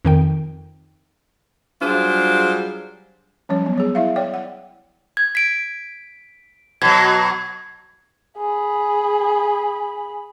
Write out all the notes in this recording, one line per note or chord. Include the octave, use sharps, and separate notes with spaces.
F2 D#3 G5
F#3 G3 D4 F4 G#4 C5
F3 G3 C#4 C#5
F#3 B3
G#4 C#5
E4 E5 F5
C#5 D5 G5
F#5
G#6
B6 D7
B2 F#3 G#6
G#4 B5